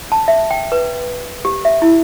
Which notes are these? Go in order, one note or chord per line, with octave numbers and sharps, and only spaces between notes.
A5
E5
G5
B4
G4
E5
E4